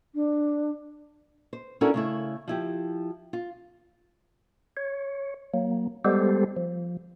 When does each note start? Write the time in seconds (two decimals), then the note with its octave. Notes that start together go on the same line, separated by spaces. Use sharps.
0.15 D4
1.53 C5
1.81 C#4 D4 E4 F#4 A4 A#4
1.94 C#3 A3 E4
2.48 F3 E4 G4
3.33 F4
4.77 C#5
5.54 F#3 A#3
6.05 G3 G#3 B3 G4 A4 C5
6.56 F3